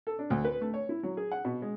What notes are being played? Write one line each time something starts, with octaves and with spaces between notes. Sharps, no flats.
A4
D4
D2
B4
A3
C#5
E4
F#3
G#4
F#5
B2
G#3